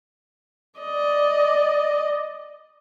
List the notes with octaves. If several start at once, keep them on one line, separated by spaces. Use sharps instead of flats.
D5 D#5